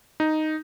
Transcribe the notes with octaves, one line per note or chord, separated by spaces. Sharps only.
D#4